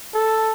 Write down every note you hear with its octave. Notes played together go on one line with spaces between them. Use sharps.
A4